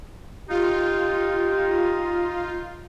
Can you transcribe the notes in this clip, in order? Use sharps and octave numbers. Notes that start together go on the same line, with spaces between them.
D#4 F4 G4